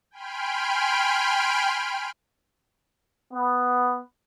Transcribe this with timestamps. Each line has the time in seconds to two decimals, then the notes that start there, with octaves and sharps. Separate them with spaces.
0.11 G5 G#5 B5 C6 F6 D7
3.33 B3